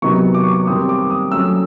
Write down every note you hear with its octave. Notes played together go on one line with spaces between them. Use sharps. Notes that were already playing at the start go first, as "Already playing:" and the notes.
C3 D#3 F#3 B3 D#4 C#6
D6
C#6
D6
D#3 G3 C4 D#6
D6
D#6
F#3 A3 C#4 E6